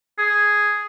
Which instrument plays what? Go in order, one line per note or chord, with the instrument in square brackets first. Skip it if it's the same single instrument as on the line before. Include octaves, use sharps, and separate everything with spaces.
[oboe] G#4